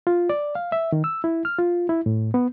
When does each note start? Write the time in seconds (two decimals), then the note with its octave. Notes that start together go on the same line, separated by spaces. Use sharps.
0.07 F4
0.30 D5
0.55 F5
0.72 E5
0.92 D#3
1.04 E6
1.24 E4
1.45 F6
1.59 F4
1.89 E4
2.06 A2
2.34 B3